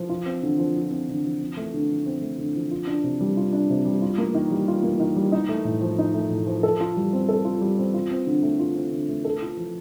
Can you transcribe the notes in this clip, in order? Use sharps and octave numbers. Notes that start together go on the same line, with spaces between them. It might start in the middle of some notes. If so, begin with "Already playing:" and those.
Already playing: F3
F4
C4
D3
F3
F4
C4
D3
F3
C4
A3
D3
F3
C4
A3
D3
F3
F4
D4
C3
G3
F4
D4
C3
G3
F4
A#3
D#3
G3
F4
A#3
D#3
G3
D#4
A3
A2
F3
D#4
A3
A2
F3
A4
F4
G3
C4
A4
F4
G3
C4
F4
C4
D3
A3
F4
C4
D3
A3
A4
F4
F3